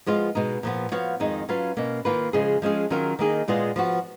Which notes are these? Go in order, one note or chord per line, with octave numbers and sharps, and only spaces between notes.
F3 G#3 B3 F4
B2 G#3 D#4
A#2 F3 B3
F3 B3 F#4 C#5 F5
F2 D#3 G#3 D#4
F#3 C#4 F4 B4 F5
B2 A#3 C#4
D#3 A#3 F4 B4
C#3 F3 G#3 C#4 G#4
F3 G#3 C#4 G#4
D#3 F#3 C#4 F4 A#4
D#3 A#3 D#4 G#4
A#2 G#3 B3 F4 G#4
F3 B3 F#4